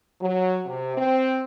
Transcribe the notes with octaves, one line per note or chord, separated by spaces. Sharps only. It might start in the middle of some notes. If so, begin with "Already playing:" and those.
F#3
C3
C4